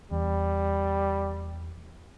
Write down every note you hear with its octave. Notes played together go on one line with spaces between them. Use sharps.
E2 G3